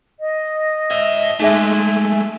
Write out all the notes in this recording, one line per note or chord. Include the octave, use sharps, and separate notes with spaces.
D#5
C#5 E5
G#3 A3 D#4 G#4 E5 G#5